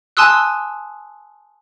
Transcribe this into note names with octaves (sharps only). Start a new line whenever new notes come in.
G#5 A5 C6 D#6 E6 F#6